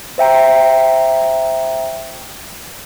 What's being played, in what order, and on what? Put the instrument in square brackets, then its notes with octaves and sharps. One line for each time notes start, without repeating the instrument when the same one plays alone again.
[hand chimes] C5 E5 G5 A#5